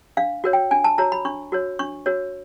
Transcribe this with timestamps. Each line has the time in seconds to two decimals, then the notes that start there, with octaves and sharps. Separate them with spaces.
0.17 D4 F5
0.44 F#4 A#4 C#5
0.53 G5
0.71 D4 G#5
0.84 A5
0.98 F#4 A#4 C#5 A#5
1.12 B5
1.25 D4 C#6
1.52 F#4 A#4 C#5
1.79 D4 C#6
2.06 F#4 A#4 C#5